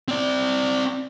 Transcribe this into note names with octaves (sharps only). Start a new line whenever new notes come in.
C4 D5